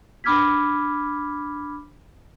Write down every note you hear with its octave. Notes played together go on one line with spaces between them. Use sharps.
D4 B5 D6 F6 G#6 B6